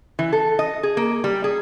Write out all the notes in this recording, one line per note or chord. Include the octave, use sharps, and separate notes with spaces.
E3
A4
D#5
G#4
A#3
G3
G#4